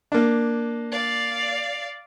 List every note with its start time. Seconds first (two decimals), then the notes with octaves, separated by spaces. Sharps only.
0.12 A#3 D4
0.92 D5 F5